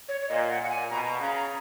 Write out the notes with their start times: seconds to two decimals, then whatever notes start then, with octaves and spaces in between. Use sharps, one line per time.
0.09 C#5
0.21 C#5
0.29 A#2 D#5
0.50 F#5
0.60 A#2 F#5
0.70 G#5
0.90 B2 A#5
1.05 A#5
1.20 C#3 A#5
1.36 A#5